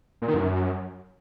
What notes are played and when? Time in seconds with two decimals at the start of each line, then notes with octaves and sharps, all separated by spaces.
0.22 A#2
0.28 D#3
0.34 F#2